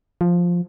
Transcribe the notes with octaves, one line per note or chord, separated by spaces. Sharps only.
F3